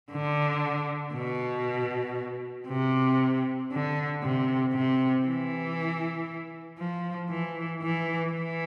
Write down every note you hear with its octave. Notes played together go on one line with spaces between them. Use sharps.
D3
B2
C3
D3
C3
C3
E3
F3
E3
E3
E3